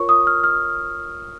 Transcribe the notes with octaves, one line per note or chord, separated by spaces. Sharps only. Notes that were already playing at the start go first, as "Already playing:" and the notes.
Already playing: F4 A#4 C#5 C#6
D#6
F6
F6